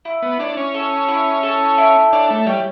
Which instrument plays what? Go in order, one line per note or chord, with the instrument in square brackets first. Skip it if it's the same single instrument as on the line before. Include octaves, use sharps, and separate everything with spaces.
[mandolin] E4
[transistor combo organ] B3
[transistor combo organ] D4 [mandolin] C#5
[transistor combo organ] C#4
[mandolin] A4
E4
A4
E4
[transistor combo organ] D4 [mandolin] C#5
[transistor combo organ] A3
[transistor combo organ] G3 [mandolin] C#5